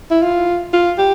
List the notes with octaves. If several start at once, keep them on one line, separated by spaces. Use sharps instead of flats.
E4
F4
F4
G4